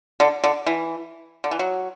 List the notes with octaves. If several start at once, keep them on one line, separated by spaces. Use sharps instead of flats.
D3
D3
E3
D3
E3
F#3